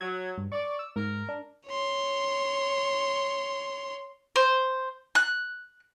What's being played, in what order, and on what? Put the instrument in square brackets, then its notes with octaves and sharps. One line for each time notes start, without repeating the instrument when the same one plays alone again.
[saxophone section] F#3 [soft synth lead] G#6
[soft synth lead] G2
[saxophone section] D5 [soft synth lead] C#6
[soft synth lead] E6
[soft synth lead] G#2 [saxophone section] A#4
[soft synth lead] D4
[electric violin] C#5 C6
[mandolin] C5
F#6